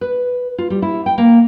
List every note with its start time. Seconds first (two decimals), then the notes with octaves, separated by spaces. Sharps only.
0.01 B4
0.58 F4
0.70 G3
0.82 E4
1.06 G5
1.18 A#3